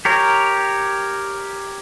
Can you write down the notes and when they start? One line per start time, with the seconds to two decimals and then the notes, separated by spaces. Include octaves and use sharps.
0.05 G4 A#4 C#5